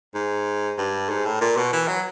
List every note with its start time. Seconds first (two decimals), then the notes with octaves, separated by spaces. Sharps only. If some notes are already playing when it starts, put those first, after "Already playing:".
0.15 G#2
0.78 G2
1.09 G#2
1.25 A2
1.41 A#2
1.57 B2
1.73 E3
1.88 F#3